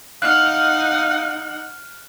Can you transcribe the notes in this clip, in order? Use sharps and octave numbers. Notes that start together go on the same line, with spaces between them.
D#4 F5 F#5 F6 F#6